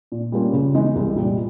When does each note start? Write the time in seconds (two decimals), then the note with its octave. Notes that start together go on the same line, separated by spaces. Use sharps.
0.12 A#2
0.32 G3 A#3 C#4 F4
0.53 C#3
0.74 E3 G#3 B3 D#4
0.96 C2
1.16 A#2 G3